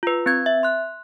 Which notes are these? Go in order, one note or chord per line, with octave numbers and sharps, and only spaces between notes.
F4 B4
C4 B4 G#6
E5
C6 F#6